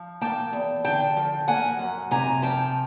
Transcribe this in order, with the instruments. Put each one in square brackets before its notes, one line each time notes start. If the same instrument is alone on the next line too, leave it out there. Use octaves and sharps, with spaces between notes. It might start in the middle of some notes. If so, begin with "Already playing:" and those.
Already playing: [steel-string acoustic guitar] F3
A#3 G5 A5
E2
D3 G5 A5
F3
A#3 F#5 G#5
F#2
C3 G#5 A#5
F3 G5 A5